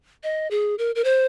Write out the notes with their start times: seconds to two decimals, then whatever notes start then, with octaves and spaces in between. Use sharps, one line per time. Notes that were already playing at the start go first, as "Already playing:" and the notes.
0.23 D#5
0.51 G#4
0.78 A#4
0.95 A#4
1.04 C5